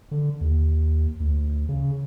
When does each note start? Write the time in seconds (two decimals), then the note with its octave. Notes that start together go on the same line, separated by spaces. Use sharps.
0.11 D3
0.41 D#2
1.20 D2
1.69 C#3